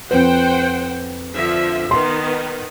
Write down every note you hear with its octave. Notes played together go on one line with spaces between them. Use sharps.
F2 B4 C5 F#5 G5
D3 F3 E5
D#3 B3 C6